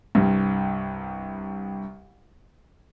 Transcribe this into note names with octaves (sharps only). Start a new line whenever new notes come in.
C2 G2